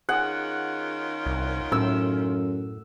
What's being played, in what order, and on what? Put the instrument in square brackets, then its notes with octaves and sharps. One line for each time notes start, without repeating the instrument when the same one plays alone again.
[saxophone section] D#3 C#4 F4 [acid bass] G#4 [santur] F#5
[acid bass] C2
[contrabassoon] F#2 [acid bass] A2 [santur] E6